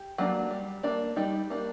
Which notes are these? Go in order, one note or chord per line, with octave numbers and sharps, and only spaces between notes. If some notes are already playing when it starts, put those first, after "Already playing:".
Already playing: G4
F#3 A#3 D4
G3
A#3 D4
G3 D#4
A#3 D4